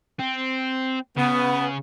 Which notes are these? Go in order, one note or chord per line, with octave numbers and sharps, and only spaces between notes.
C4
C#3 B3